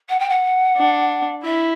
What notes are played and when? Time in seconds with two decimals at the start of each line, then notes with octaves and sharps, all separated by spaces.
0.09 F#5
0.19 G5
0.29 F#5
0.77 D4
1.44 E4 E5